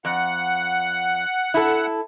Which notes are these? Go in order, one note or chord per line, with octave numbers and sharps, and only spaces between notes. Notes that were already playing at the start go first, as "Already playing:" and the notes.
F2 F#5
E4 A4